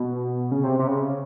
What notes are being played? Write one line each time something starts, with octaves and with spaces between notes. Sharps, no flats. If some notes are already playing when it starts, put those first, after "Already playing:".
Already playing: B2
C#3
C3
C3
C#3